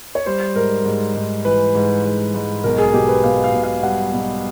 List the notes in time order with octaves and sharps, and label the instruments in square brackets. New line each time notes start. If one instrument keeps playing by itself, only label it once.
[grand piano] C#5
G3 C5
G#2 A#4
G#2
G#2
E3 B4
G#2
G#2
G#2
B1 A#4
G#4
B2 G4
B4
B2 F5
F5
B2
F5
G3 F#5
B2